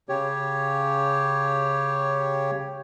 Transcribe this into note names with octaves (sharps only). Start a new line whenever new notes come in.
C#3 G4 C#5